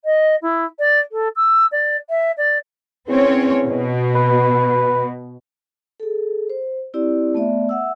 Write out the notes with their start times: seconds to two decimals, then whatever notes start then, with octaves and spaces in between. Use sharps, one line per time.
0.05 D#5
0.42 E4
0.79 D5
1.12 A4
1.36 E6
1.72 D5
2.09 E5
2.37 D5
3.08 E2 C4 C#4 C#5
3.66 B2
4.15 B4
6.00 G#4 A4
6.50 C5
6.94 C4 E4 G4 D5
7.34 A3 B3 D5 E5
7.69 E5 F#5 E6